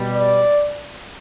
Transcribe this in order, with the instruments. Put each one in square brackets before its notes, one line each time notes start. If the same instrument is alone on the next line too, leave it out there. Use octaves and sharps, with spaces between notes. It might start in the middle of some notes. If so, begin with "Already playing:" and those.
Already playing: [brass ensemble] B2 G3
D5